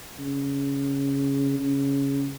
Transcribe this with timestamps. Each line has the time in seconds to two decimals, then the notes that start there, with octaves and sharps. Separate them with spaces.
0.19 C#3
1.59 C#3